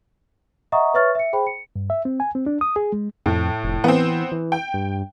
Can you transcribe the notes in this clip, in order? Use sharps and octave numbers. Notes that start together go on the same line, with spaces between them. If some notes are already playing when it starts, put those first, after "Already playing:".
D#5 E5 F#5 A#5 C#6 D#6
B4 C#5 E5 C#6 F6 A6
E5 C#7
G#4 C5 G5 B5
C#7
G2
E5
C4
G#5
C4
D4
D#6
G#4
G#3
F2 A2
F1
E3 B3 C4
E3
G5
G2